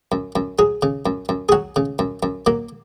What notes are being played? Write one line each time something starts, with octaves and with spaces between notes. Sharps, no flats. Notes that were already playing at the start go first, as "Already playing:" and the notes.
F#2
F#2
F#3 G#4
C#3
F#2
F#2
G#4
F#3 F#4
C#3
F#2
F#2
F#3 A#3